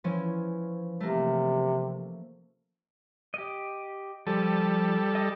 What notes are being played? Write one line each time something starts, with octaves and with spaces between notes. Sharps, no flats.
E3 F3 C#4
C3 A3 A#3
G4 D#5
F3 G3 A4
D#5 D#6